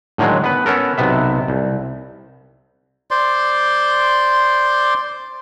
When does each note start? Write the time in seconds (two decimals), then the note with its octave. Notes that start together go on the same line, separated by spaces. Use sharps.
0.18 A2 D3 D#3 F#3 G#3
0.44 B3 B4
0.66 B3 C#4 A4 A#4
0.98 B1 C3 B3 E5
1.48 C2
3.11 C5 D5 C6